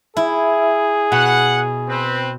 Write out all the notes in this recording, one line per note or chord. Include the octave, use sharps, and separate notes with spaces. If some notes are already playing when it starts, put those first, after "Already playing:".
E4 G#4
B2 F#5
C4 B4